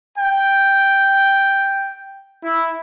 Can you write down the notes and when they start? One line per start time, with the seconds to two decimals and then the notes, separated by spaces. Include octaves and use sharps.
0.16 G5
2.44 E4